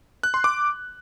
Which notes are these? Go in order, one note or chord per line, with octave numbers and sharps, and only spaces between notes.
F#6
C6
D6